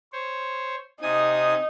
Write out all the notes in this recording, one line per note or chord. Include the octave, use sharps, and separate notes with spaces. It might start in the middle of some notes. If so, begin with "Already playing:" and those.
C5 C#5
C3 D#4 G#5 D#6